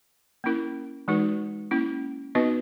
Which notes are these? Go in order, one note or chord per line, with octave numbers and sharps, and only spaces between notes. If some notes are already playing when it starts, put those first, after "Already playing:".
A#3 C#4 E4 A#4
E3 G#3 D#4 F#4 B4
A#3 C#4 E4
B3 D#4 F#4 B4 D#5